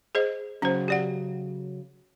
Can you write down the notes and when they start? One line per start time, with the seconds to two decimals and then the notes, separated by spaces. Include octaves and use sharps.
0.15 G#4 C5 D#5
0.62 C#3 F#3 C#4 C5
0.88 G4 D5 F#5